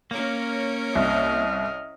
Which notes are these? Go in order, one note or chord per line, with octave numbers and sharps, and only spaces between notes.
A#3 C#4 A#4 C#5
C2 D#5 F6